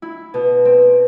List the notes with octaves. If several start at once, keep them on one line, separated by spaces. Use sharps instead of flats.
E4
B2
C4